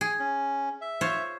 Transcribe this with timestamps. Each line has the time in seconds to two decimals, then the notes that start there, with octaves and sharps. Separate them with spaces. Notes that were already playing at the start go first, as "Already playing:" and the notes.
0.01 G#4
0.19 C#4
0.81 E5
1.01 F4 C5 C#5